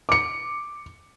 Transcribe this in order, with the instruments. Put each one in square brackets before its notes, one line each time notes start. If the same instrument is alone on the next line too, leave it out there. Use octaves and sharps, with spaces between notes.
[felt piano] D6 C#7